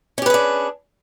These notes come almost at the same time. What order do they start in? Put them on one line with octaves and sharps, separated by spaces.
C#4 G4 B4 G#4 D4